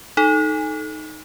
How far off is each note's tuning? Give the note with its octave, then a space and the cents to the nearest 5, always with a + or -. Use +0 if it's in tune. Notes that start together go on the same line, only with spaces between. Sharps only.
D#4 +0 A4 -20